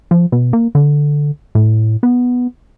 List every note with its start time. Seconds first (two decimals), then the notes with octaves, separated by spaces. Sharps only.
0.11 F3
0.32 B2
0.53 A#3
0.75 D3
1.55 A2
2.03 B3